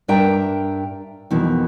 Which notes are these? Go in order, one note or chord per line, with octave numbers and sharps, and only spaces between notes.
G2 D4 A#4 E5 G5 A#5
F2 B2 D#3 E3